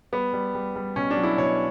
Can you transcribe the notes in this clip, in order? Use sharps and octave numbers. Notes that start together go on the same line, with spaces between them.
G3 B3
G3
G3
G3
B2 C#4
D4
F#3
E4
B2 C#5